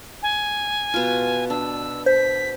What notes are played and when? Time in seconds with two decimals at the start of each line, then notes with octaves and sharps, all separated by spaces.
0.23 G#5
0.94 B2 F4
1.50 D4 E6
2.06 C5 B6